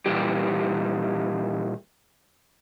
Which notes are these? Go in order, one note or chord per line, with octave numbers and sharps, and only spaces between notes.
A#2 E3 G3 G4